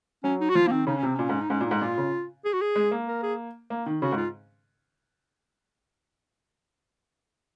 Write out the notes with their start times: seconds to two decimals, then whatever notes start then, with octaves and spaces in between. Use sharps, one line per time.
0.24 F#3 C#4
0.41 D#4
0.50 F#4
0.55 F3 F4
0.67 A#3
0.71 D#3 C4
0.87 C#3 D#4
0.97 C#4
1.03 C3 C4
1.15 A#2 C#4
1.29 G#2
1.40 D#4
1.50 G#2 C#4
1.61 A#2
1.66 G#2 D#4
1.81 A#2 F4
1.98 C#3
2.45 G#4
2.53 F#4
2.61 G#4
2.76 G#3
2.91 A#3
3.08 A#4
3.23 G#4
3.70 A#3
3.86 D#3
4.02 C#3 F#4
4.12 G#2
4.17 F4